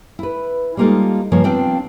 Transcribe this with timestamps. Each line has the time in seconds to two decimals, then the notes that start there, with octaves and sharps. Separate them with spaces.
0.19 E4 B4
0.77 G3 G#3 A#3 D#4 F4 A4
1.32 G2 C#3 F3 A#3 C#5
1.44 B3 C4 D4 F4 G5